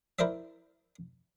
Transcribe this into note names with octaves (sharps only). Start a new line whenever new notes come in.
E4 A#4 C5 D5 E5